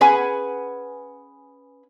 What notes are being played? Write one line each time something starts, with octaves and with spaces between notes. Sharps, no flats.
C#4 G#4 B4 F#5 G#5